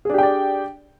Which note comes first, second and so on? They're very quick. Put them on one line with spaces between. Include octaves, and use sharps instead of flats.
G#4 D4 G4 G5 D5